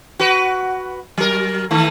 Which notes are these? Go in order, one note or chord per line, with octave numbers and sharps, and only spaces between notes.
F#4 B4
F#3 A#4
D#3 E3 A3